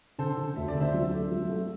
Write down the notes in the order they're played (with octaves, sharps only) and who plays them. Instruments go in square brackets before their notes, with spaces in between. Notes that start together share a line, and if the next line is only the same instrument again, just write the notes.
[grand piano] D3 [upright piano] A4 C5
[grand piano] D3
[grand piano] D2 [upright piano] E5
[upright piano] D5
[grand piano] D3
[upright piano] C5 E5
[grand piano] F#3
A3
F#3
A3